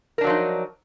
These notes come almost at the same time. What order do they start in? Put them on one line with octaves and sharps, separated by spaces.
A#4 D4 F#3 F3 D#4